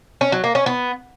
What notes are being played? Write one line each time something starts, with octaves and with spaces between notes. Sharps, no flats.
C#4
F#3
A#3
C#4
B3